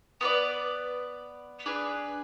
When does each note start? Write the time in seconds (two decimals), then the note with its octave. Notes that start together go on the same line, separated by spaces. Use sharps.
0.21 B3 F4 B4 D5
1.66 D4 G#4 B4